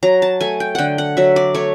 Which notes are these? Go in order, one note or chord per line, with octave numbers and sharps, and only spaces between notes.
F#3 A#5
A5
A3 G#5
G5
D3 F#5 G5
F#5
F#3 E5
D5
A3 C#5